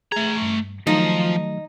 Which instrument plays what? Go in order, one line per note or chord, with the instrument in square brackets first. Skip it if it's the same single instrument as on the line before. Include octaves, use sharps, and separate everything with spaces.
[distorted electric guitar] A3 A#5 [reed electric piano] G#4 G#6
[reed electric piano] G2
[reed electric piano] D#3 F#3 A3 [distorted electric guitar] F3 [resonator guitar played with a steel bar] D#4